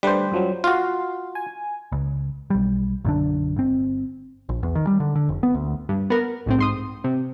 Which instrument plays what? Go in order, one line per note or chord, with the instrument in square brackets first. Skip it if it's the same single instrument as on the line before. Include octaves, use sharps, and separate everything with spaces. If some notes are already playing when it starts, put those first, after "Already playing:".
[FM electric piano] D3 A3 B4 [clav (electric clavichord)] G3 C5
[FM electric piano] F#2 F3 F#3
[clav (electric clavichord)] F4 F#4 [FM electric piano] F5
[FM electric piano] G#5
[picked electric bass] C#2
B1 G3
B1 F#2 D3 D4
G1 C4
A#1
E2
D#3
G3
D3
D3
F1
B3
D2
[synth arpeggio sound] G2
B3 A#4
B1 A2 C4
G#2 C6 D#6
C3